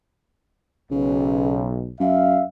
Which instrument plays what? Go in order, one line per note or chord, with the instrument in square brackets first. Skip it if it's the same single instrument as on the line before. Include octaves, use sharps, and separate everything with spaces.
[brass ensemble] B1 [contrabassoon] C#3
[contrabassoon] F#2 [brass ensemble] E5 F5